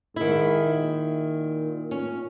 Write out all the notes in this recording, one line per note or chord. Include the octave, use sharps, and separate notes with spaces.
G#2 D#3 E4
A#2
C#4